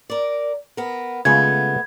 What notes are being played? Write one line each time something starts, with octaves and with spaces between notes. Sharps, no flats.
A#4 D5
B3 A#4
C#3 G#3 A3 B3 F4 G#6